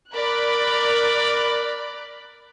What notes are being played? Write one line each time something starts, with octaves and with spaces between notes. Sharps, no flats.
A#4 D5 B5 F#6